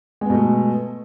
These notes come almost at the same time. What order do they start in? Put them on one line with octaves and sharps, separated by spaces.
G#3 B3 B2 A3